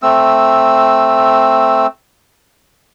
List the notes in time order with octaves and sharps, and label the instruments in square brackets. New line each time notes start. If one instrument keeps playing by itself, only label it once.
[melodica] A3 C4 E6